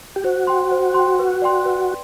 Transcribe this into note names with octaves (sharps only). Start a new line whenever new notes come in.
G4
F#4 C5
G5 C6
C5
G5 C6
B4
D5 G5 C6
B4